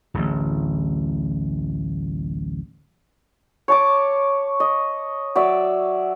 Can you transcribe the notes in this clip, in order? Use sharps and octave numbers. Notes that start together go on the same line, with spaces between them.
D1 A1
C#5 A5 D6
D#5
F#3 D5 E5